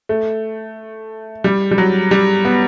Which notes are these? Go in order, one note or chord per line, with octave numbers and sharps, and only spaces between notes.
A3
G3
G3
F#3
G3
B3